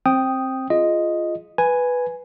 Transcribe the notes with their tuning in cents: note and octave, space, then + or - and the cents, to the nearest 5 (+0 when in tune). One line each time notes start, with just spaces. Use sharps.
C4 +15 G5 +0 D#6 +0
F4 -15 G#4 +15 D#5 +0
B4 +0 G#5 +0